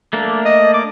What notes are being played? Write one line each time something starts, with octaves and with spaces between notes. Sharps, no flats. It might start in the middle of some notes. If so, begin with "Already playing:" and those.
A3 A#3 D4
D#5
D6